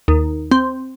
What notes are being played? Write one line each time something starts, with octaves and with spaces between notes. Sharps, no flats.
D#2
C4